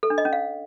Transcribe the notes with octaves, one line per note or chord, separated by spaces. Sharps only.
A4
D4
D#5
C#4
F5